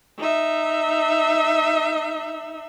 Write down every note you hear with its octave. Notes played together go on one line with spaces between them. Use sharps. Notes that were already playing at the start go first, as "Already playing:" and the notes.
D#4 E5